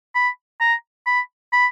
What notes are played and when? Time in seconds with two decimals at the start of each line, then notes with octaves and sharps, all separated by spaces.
0.15 B5
0.60 A#5
1.06 B5
1.53 B5